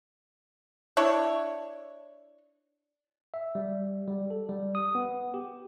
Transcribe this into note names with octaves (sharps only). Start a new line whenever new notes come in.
D4 E4 C#5
E5
G3
G3
A4
G3
D#6
B3
G4